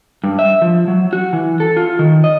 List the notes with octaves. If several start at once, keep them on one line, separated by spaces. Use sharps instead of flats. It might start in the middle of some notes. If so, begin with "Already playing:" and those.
G2
E5
F3
F#3
F#4
E3
A4
F4
D#3
D#5